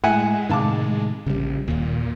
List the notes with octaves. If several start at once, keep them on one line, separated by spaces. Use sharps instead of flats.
A2 G#3 E5 F#5 G#5
A2 C3 D#3 F5 A5 D6
A#1 C#3 G3
D#1 D#2 A#2